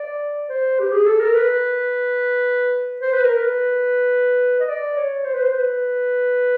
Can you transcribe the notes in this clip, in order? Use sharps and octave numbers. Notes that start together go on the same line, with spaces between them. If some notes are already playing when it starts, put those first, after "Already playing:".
Already playing: D5
C5
G4
G#4
A4
A#4
B4
C5
B4
A#4
B4
D#5
D5
C#5
C5
B4
C5
B4